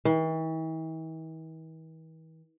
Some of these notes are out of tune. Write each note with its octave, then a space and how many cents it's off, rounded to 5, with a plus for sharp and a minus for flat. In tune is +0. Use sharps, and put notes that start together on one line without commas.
E3 -45